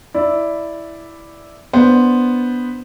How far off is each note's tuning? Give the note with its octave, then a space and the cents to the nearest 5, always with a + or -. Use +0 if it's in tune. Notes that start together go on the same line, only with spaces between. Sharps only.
E4 +0 D5 +0
B3 +0 D4 +0 C5 +0